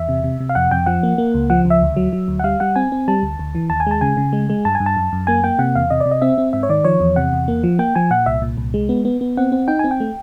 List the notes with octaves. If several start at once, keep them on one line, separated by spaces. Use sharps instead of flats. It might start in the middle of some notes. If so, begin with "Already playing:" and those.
Already playing: E2 E5
C3
C3
C3
F5
F2 F#5
F2 G5
F3 F#5
A#3
A#3
C#2
F3 F#5
C#2
E5
D2
F#3
F#3
D2
F#5
G3 F5
G3 F#5
C4 G#5
C4
G3 A5
D2
D2
E3
D#2 A5
G#5
G#3 A5
C#3 G#5
C#3
G#3
G#3
G2 A5
G#5
G2
A5
F#2
F#2
A#3 G#5
A#3 G5
C3 F#5
E2 F5
C3 D#5
D5
C3
D#5
C4 E5
C4
G#2 E5
C#5
D#3 D5
F3 C#5
E2
C3 F#5
E2
A#3
F3
A#3 G5
F3 G#5
A#2 F#5
C2 E5
A#2
C2
G#3
B3
B3
B3
C4 F#5
C4
D#4 G5
C4 G#5
G5
A3